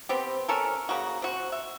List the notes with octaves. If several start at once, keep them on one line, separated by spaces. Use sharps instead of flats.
B3 C4 G4
C#4 A4 A#4
C#3 A#3 F#4
C4 F#4
E5